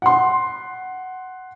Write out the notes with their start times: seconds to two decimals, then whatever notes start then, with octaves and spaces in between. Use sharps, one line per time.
0.02 F#5 C6